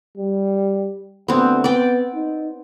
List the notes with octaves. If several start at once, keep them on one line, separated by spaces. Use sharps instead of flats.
G3
D2 B3 C4
B3 D5 G5
D#4